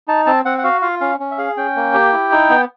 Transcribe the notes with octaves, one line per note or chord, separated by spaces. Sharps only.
D#4 A5
C4 A5
C4 F#5
F#5
F#4 F5
F4 F5
C#4 F5
C#4
E5
G#4 F5
C#4 G5
A#3
G4
E4
D#4
B3